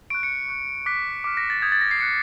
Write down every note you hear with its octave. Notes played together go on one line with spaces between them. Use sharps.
C#6 F#6 D7
C#7
C#6 F#6
D6 F#6 B6
D6 F6
A#6
A6
D#6 G6 G#6
A6
A#6
C7
D#6 F#6 C#7